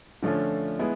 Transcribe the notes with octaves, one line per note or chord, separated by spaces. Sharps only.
D3 F3 A3 C#4
G#3 B3 E4